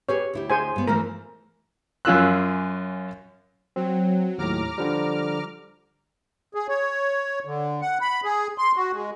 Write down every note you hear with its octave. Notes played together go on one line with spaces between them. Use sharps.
G4 G#4 B4 C#5
D2 E4 G4
G#4 C5 G#5
G2 B3
E3 F3 A3 A#4
F#2 C#4 F4 E6 F#6
F#3 C4
D#2 A2 A#5 D6 F6
D3 F3 G3
G#4
C#5
D3
F#5
B5
G#4
C6
F#4
G#3